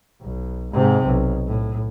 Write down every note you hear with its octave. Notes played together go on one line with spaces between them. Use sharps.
B1
G#2 C3
B1
A2